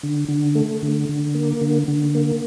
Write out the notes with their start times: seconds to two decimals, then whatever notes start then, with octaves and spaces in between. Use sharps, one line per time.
0.03 D3
0.29 D3
0.55 A3
0.82 D3
1.09 D3
1.35 A#3
1.61 D3
1.88 D3
2.15 A#3